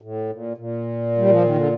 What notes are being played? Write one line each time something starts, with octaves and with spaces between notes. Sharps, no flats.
A2
A#2
A#2
G3
F3
D#3
D3